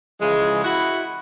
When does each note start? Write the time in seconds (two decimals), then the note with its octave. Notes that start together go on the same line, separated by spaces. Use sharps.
0.21 C#3 E3 F3 G#3
0.64 E4 F#4